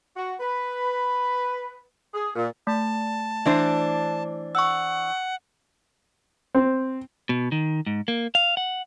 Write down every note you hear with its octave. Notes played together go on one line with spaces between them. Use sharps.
F#4
B4
G#4
A#2
A3 A5
E3 D4 C5
F#5 C#6 E6
C4
B2
D#3
G#2
A#3
F5
F#5